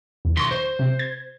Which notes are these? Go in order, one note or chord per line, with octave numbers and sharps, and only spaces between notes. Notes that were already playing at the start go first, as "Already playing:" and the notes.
E2
B1 D#3 C6 C#6 A#6
C5
C3
G#6